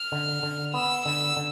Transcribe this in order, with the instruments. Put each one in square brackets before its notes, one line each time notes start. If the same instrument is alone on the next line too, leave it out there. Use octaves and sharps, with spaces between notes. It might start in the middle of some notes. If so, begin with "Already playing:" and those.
Already playing: [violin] F6
[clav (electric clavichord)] D3
D3
[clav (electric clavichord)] B3 [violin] E6
[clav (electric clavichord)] D3 [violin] E6
[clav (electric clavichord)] D3